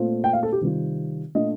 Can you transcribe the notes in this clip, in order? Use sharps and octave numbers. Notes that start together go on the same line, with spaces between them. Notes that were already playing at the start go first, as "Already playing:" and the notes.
Already playing: A#2 A3 C4 F4
G5
F5
A4
G4
C3 D#3 G3 C4 F4
A#2 A3 D4 F4 D#5